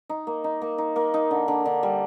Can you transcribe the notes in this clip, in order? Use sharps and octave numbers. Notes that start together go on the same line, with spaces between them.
D#4
A#3
D#4
A#3
D#4
A#3
D#4
D3
D3
D3
G3